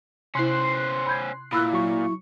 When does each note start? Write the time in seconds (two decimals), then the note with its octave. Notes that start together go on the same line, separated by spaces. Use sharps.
0.35 C3 C#4 E4 C5 C6 F#6 C7
1.07 B5 G6 G#6
1.52 A#2 E4 B5 E6 F#6
1.73 F#3 C#6